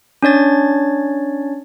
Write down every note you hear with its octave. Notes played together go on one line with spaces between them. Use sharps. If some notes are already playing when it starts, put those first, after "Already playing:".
C#4 D4 C#5 A6